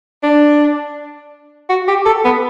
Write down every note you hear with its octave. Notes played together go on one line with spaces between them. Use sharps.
D4
F#4
G4
A4
B3